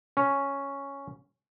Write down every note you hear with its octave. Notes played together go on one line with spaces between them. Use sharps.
C#4